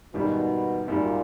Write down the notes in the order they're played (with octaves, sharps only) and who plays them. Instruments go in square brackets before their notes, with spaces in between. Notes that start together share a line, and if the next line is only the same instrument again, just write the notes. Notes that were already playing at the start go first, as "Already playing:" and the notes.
[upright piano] G#1 F#2 D#3 G3 [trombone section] B2
[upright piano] G#1 F#2 D#3 G3 [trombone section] A#2